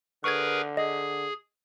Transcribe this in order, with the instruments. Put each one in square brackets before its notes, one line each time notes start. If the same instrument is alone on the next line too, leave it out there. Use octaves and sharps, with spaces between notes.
[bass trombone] D3 [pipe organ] G#4 A#4 B4 [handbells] C#6 G#6
[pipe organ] G#4 [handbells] D#5